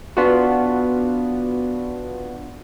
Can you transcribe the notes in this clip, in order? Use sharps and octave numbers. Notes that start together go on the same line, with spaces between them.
B3 D4 F4 F#4